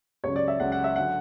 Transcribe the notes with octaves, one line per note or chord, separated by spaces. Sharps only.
C#2 C#3 F#3 C#5
D5
E5
C#2 C#3 F#3 F#5
F#5
E5
D3 F#3 F#5